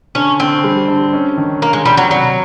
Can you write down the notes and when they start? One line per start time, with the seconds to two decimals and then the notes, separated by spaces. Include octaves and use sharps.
0.15 D3 C#4
0.40 D3 C4
0.64 G3
0.88 D3
1.13 C#4
1.37 D#3
1.61 D#3 A#3
1.73 G#3
1.85 D#3 G3
1.97 F#3
2.10 C3 F#3